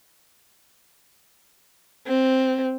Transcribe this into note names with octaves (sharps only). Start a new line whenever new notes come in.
C4